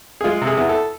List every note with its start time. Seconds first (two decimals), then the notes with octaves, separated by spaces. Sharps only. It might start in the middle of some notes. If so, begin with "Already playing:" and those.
0.21 G#4
0.24 G#3 F4
0.42 C3
0.47 G#4
0.57 E2
0.69 A4